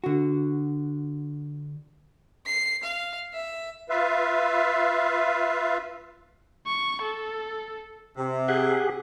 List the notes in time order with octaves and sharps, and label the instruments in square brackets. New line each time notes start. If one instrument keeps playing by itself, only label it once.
[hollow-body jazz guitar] D3 F#4
[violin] C7
F5
E5
[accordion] F4 B4 E5 F5
[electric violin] C#6
A4
[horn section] C3
[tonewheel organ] G4 G#4 [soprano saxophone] F#5